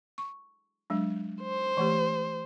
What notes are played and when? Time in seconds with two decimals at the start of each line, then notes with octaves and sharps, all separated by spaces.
0.18 C#6
0.90 F#3 G#3 D4
1.43 C5
1.77 E3 A3 G4